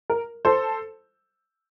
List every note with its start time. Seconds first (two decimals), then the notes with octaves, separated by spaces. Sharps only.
0.10 A#4
0.45 A4 C5